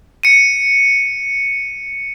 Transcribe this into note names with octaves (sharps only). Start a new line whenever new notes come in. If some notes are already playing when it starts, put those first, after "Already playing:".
C#7 D#7